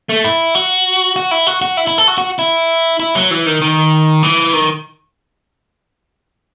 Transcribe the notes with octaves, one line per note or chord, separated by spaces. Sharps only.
A3
E4
F#4
F#4
E4
F#4
F#4
E4
E4
A4
F#4
F#4
E4
E4
F#3
E3
D#3
D#3
E3
D#3